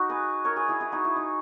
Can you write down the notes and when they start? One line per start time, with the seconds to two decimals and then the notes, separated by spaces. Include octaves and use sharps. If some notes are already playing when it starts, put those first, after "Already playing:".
Already playing: D#4 F#4
0.09 G#4 B4
0.45 A#4 C#5
0.56 G#4 B4
0.69 E4 G#4
0.80 E4 G#4
0.92 D#4 F#4
1.05 E4
1.16 D#4